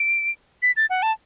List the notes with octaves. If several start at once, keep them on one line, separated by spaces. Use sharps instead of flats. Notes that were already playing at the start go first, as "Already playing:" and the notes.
Already playing: D7
B6
A6
F#5
A5